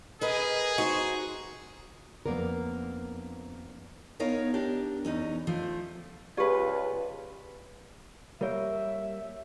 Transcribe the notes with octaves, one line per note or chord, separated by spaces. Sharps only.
G#4 A#4 B4 D#5
D#4 F#4 C5
F2 A#3 B3 D4 A#4
B3 D#4 A#4 C#5 F5
D4 G4 A#4
E2 C#4 D#4
F3 A3
C#2 F4 G4 G#4 B4 D5
G3 A#3 A#4 C#5 E5